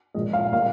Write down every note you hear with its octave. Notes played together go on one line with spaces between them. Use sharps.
A#2 F3 G#3 D#5
F5
A#2 G3 A#3 F5